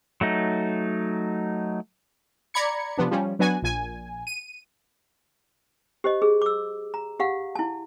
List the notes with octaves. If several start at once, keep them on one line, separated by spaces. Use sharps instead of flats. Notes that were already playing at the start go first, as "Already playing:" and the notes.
F#3 A3 D#4
D5 A#5 B5 G#6 C#7
C3 F3 B3 D4
F3 G3 C#4
F#3 B3 D4 F#4 G#5
A#1 A#2 G#5
D#7
G4 C5 D#5
G#4
D6 E6
A#5
G4 F5 F#5
E4 A5